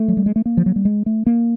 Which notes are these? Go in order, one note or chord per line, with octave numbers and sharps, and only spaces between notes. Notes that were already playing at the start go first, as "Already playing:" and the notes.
Already playing: A3
F#3
G3
G#3
A3
A#3
F3
F#3
G3
G#3
A3
A#3